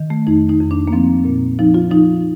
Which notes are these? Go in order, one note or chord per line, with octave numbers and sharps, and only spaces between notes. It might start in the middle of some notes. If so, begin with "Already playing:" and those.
Already playing: D#3
A3
F2 D#4
D#4
F2
D4
A#3
F3 C4
A#2
F3 D#4
F4
F3 D#4